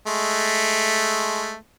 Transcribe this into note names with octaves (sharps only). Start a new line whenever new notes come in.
G#3 A3